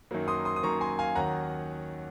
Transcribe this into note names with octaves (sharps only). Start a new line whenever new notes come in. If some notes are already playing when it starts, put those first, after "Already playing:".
F#2 D#3 F#3 A#3
C6 D#6
C6 D#6
D#6
F#2 D#3 F#3 A#3 A#5 C#6
G#5 C6
F5 G#5
D#2 D#3 F#3 C#4 F#5 A#5